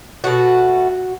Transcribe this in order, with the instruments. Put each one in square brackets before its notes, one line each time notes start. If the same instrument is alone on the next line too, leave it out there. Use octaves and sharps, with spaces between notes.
[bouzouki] B2 A3 F#4